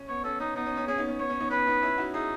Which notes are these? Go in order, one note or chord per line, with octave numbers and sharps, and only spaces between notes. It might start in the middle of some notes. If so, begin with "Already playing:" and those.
Already playing: C#4
B3 C#5
C#4 A4
C#4 D#4
B3 D#4
C#4
C#4
C#4 G#4
B3 D#4
C#4
B3 C#5
C#4
B3 D#4
C#4 B4
B3 D#4
C#4 E4
D#4 F#4
D#4 E4 G#4